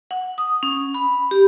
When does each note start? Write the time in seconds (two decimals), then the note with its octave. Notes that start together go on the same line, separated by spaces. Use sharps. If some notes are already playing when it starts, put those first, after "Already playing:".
0.11 F#5
0.38 D#6
0.63 C#4
0.94 B5
1.31 G4